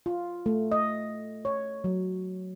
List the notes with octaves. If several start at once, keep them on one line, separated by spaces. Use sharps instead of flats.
F4
A3
D#5
C#5
F#3